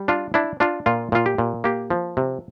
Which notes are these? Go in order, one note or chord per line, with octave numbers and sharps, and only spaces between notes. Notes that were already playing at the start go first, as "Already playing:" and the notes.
Already playing: G3
D4 F4
D4 E4
D4 F4
A#2 F4
A#2 F4
G4
A#2
A#3 G4
F3
C3